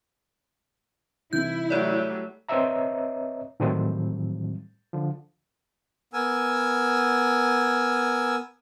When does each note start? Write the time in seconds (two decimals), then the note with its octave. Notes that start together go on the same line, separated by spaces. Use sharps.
1.33 C2 E3 D#4 E4 G6
1.70 F#3 G3 A3 C#5 D5
2.49 C4 B4 C#5 D#5 E5 A#5
3.60 A2 D#3 E3 F#3 G3 C4
4.93 D3 F3
6.13 B3 A#4 G#5 E6